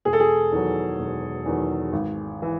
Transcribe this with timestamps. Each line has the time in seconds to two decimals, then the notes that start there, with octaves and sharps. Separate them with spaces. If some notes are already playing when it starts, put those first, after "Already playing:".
0.05 E1 G#4
0.13 A4
0.20 G#4
0.52 E2 D#3 F#3
0.99 E1
1.46 E2 D#3 F#3
1.93 G#1
2.42 E3